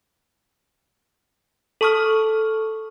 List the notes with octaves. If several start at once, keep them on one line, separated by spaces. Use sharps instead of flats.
A4 A5 C#6 D#6 F6